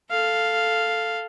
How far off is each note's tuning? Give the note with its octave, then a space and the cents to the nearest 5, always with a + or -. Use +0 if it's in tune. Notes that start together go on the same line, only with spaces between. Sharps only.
A4 +0 F5 +0